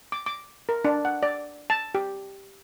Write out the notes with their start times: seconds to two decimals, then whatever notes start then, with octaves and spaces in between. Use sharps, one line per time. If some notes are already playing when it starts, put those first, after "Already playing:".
0.12 D6
0.26 D6
0.69 A#4
0.85 D4
1.05 F#5
1.23 D5
1.70 A5
1.95 G4